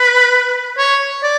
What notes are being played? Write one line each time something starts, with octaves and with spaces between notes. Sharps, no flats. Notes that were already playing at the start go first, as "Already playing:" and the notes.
Already playing: B4
C#5
D5